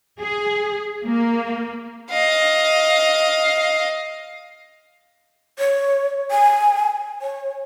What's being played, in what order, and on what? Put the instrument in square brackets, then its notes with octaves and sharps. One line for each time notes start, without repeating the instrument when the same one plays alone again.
[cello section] G#4
A#3
[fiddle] D#5 F5
[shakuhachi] C#5
G#5
C#5